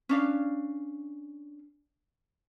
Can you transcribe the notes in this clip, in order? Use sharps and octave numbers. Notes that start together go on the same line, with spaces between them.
C#4 D4 F5